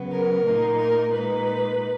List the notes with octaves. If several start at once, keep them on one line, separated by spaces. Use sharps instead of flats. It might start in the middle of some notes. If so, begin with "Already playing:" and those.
Already playing: C#3 F#3 B3
A#4
A#2 A#3 D#4
A#4
A#2 G#3 D#4 B4